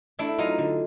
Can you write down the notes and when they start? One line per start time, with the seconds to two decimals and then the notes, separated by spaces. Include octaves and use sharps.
0.19 A3 D4 E4
0.38 F#3 D#4 F4
0.58 D3